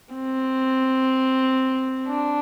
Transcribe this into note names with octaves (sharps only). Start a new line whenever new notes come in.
C4
D4